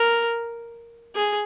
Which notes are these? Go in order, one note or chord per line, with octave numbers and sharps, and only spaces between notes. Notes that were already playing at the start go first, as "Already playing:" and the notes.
Already playing: A#4
G#4